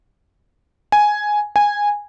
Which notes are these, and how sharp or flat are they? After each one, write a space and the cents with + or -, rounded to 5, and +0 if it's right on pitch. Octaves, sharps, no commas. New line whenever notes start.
G#5 +5
G#5 -10